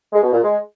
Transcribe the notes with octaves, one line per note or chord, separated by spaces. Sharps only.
G#3
B2
A#2
G#3